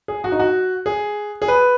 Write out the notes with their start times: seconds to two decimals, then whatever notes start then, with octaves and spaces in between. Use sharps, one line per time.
0.08 G#4
0.24 F#4
0.32 D#4
0.39 F#4
0.86 G#4
1.42 G#4
1.48 B4